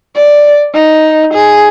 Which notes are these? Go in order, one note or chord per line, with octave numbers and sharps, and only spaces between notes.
D5
D#4
G#4